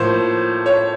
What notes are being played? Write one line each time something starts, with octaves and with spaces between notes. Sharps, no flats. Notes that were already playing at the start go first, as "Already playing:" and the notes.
Already playing: A2 F3 A#3 C5
C#5